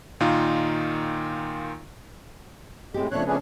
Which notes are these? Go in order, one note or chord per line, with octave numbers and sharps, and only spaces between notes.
A#2 D#3 D#4 F4
A2 G#3 C4 G4
C#3 F3 A3 B3 C4 D4 C#5 F#6
F3 A3 C#4 D4 G#4 B4